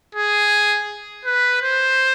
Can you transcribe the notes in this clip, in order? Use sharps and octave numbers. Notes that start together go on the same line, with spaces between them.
G#4
B4
C5